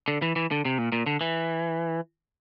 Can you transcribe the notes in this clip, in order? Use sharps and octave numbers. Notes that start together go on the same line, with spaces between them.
D3
E3
E3
D3
C3
A#2
A#2
D3
E3